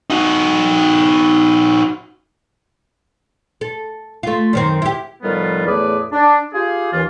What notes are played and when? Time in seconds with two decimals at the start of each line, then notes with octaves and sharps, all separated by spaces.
0.10 D#4 F#4
3.61 A4
4.23 A3 F4
4.53 F#2 D#3 C4
4.82 E4 G4
5.23 A2 D#3 F3 G3 B3 F4
5.66 E2 A2 A3 G#4 B4 D5
6.12 D4
6.53 F4 G4 G#4
6.93 D#2 E3 F4